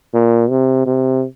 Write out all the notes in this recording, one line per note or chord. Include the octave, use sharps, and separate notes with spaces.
A#2
C3
C3